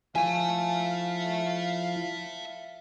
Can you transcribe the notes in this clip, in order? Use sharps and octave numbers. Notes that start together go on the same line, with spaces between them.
F3 E4 E5 F5 G#5 A5